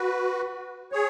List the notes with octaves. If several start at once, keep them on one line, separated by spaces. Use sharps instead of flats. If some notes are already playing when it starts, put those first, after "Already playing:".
Already playing: F#4 B4
G#4 C#5